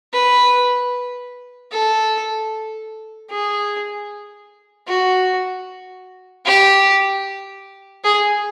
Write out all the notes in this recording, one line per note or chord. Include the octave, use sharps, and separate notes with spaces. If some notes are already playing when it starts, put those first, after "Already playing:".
B4
A4
G#4
F#4
G4
G#4